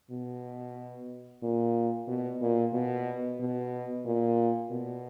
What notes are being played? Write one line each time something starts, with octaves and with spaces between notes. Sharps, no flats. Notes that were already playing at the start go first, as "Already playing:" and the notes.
B2
A#2
B2
A#2
B2
B2
A#2
B2